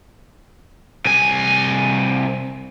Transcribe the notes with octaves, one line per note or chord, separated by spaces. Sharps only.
C2 G#5